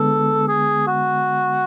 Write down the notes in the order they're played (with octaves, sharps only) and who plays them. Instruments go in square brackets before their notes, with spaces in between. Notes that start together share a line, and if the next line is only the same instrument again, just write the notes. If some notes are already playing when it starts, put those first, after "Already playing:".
Already playing: [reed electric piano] D3 G#3 B3 [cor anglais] A4
[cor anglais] G#4
F#4